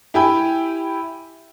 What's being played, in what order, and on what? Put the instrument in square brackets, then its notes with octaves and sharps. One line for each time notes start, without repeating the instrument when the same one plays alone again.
[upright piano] E4 G4 G5 G#5 B5